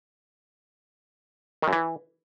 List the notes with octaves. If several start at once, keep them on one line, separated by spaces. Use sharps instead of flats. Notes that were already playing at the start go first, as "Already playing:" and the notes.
D#3
F#2
E3